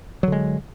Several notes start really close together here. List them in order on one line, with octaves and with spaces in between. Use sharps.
F#3 D3 G#3